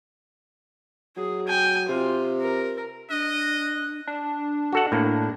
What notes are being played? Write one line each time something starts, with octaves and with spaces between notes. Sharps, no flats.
F#3 G#4
G5 G#5
C3 F4
A#4
D4 D#5 F#6
D4
F#4 A4 F#5
A2 A#3